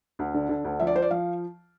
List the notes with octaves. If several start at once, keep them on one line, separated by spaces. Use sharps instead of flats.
D2
D3
D3
D2
F3 E5
D5
F3 C5
D5
F3 F5